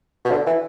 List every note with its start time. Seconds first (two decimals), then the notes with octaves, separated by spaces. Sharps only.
0.25 B2
0.31 D3
0.47 E3